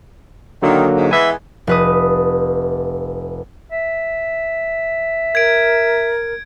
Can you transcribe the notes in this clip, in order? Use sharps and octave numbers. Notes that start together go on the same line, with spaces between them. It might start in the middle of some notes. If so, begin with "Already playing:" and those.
D3 D#3 F#3 A#3
G#2
E3 G#3 B3 E5 G#5
F1 B4 D#6
E5
A#4 G#6 D7